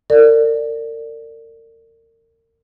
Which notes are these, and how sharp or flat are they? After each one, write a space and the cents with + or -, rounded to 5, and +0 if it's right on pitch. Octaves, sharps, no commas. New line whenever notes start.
A#4 -40 D5 +0